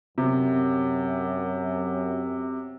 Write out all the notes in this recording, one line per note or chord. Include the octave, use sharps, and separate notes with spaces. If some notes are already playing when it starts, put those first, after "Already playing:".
F#2 C3